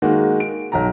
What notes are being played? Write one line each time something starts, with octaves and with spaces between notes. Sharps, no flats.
D#3 G#3 A#3 F#4
D7
B1 F#3 A#5